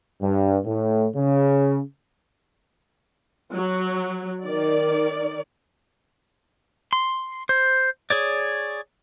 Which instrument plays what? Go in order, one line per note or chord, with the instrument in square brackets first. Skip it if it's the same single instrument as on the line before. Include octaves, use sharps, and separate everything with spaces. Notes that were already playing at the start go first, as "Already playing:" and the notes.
[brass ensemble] G2
A2
C#3
[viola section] F#3
D#3 D5
[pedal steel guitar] C6
C5
G#4 C#5 D5